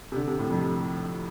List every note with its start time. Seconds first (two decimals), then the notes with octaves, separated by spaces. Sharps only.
0.12 C3
0.16 D3
0.28 C3
0.39 A2
0.50 F2